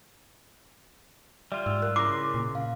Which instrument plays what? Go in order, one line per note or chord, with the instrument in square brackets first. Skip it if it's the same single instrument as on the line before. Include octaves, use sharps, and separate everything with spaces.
[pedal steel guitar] G3 F4 [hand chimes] D5 E5
[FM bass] G#2 [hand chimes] E6
[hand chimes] A#4 F#6
[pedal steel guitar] C#3 C6 [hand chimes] E4 A#5 A#6 [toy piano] D6
[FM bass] A#2
[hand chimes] F5